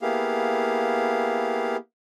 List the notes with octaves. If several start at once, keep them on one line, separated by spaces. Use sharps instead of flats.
A#3 B3 E4 G4 G#4 F5